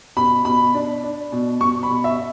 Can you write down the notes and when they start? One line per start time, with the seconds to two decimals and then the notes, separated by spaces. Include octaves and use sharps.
0.17 B2 B5
0.45 B2 B5
0.74 D4
1.03 D4
1.32 B2
1.61 B2 C#6
1.83 B5
1.90 B2
2.04 E5